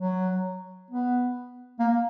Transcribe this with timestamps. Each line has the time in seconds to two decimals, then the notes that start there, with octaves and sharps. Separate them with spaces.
0.01 F#3
0.91 B3
1.80 A#3